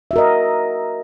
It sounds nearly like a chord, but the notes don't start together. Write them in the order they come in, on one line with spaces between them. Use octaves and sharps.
E5 F#4 A#4 D#5